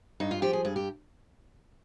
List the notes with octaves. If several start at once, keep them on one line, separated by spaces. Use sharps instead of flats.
G2 D#4
F4
F3 G4
G#4
G2 G#4
G4